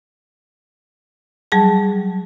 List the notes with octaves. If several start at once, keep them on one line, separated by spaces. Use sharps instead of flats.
F#3 G3 G#4 A5